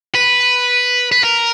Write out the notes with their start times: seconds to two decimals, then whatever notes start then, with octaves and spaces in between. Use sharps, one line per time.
0.15 B4
1.12 B4
1.24 A#4